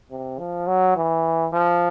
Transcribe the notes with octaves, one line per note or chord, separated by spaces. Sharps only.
C3
F3
F#3
E3
F3